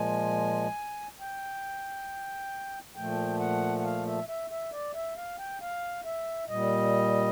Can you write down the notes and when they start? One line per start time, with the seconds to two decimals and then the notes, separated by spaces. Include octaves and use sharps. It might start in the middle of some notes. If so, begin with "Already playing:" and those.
Already playing: A#2 F3 G#3 G#5
1.20 G5
2.96 A#2 F3 A3 G5
3.40 F#5
3.78 F#5
3.84 F5
4.06 E5
4.28 E5
4.50 E5
4.72 D5
4.94 E5
5.16 F5
5.39 G5
5.61 F5
6.05 E5
6.48 A#2 G3 D#5